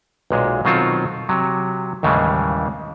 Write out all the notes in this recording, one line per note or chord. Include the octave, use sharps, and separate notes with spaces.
B1 A#2 G#3
B2 D#3 F#3 C4 F4 A4
C3 F#3
D#2 A2 C#3 E3 G3 G#3